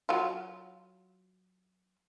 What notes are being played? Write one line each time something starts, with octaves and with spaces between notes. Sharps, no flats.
F#3 F4